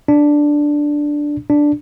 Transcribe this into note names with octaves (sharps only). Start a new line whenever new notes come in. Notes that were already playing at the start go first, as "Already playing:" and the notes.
D4
D4